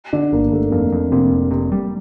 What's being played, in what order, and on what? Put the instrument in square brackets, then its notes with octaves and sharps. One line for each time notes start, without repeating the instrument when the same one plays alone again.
[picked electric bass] D3 [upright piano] D4
[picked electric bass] G1 [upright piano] A#3
[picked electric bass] G1 [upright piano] A3
[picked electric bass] F2 [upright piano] A#3
[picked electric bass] F2
[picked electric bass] C3 [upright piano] A#3
[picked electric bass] F1
C3
G3